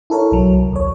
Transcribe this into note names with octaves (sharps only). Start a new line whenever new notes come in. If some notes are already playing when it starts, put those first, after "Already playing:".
E4 A4 A#4 C#5
B1 F#3
C2
D#2 C#5